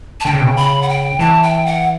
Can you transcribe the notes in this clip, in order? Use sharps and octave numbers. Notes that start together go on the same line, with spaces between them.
A5
D3 G5
C#3
B2
C#3
B5
F#5
G5
E3 A5
G5
F#5